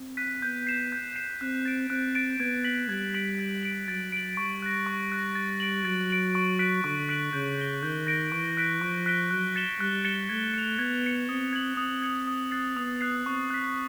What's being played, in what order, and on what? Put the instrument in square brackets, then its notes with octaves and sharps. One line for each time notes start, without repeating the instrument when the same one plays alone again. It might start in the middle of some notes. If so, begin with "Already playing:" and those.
Already playing: [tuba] C4
[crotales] F#6 B6 D#7
[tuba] B3 [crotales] G6
[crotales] C7 E7
G6
C7 E7
[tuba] C4 [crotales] F#6
[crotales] A6 D7
[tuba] C4 [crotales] F#6
[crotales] A6 D7
[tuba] B3 [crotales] G#6
[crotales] B6 D7 F#7
[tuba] G3 [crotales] G#6
[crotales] B6 D7 F#7
A6
D7 F#7
[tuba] F#3 [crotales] A6
[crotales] D7 F#7
[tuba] G3 [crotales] C#6
[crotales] F#6 A#6
C#6
F#6 A#6
A6
D7 F#7
[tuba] F#3 [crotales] A6
[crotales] D7 F#7
C#6
F#6 B6 D7 F#7
[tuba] D3 [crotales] C#6
[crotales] F#6 B6 D7 F#7
[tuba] C#3 [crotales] G6
[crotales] A#6 D7 G7
[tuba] D#3 [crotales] G6
[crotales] A#6 D7 G7
[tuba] E3 [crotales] C#6
[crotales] F#6 B6 D7 G7
[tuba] F3 [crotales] C#6
[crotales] F#6 B6 D7 G7
[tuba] F#3 [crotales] F#6
[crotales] A6 C#7 E7 G7
[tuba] G3 [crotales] F#6
[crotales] A6 C#7 E7 G7
[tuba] A3 [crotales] G#6
[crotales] C#7 F7
[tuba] B3 [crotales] G#6
[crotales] C#7 F7
[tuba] C4 [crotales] D#6
[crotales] G#6 C#7 F#7
[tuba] C4 [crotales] D#6
[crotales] G#6 C#7 F#7
D#6
F#6 A6 C7
[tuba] B3 [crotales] D#6
[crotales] F#6 A6 C7
[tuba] C4 [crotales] C#6
[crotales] F#6 B6